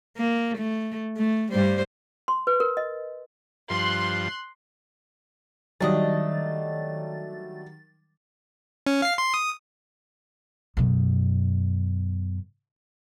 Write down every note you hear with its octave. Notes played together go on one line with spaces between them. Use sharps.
A#3
A3
A3
G2 G3 C5
C6
B4
A#4
D#5
G2 F3 C6 F#6
D#3 F#3 G3 A3 D4 D#5 A6
C#4
F5 C7
C6
D#6
F#2 B2